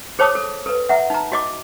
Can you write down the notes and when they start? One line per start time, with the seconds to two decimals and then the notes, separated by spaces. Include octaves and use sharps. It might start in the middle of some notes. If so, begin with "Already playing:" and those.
0.19 G#4 C5 C#5 A5 D6 D#6
0.35 A4
0.66 A4 B4
0.89 E5 F#5 A#5
1.10 D#4 A#5
1.32 F#4 D#5 D6